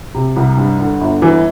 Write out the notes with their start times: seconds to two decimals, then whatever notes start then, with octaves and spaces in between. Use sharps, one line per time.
0.14 C3
0.36 C2
0.57 G2
0.79 D3
1.01 G1
1.22 E3